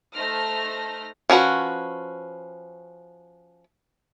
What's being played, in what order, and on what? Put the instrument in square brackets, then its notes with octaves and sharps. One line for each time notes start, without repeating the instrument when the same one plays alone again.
[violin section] A3 D#4 C5 F6 A#6
[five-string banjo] F3 C#4 F#4 B4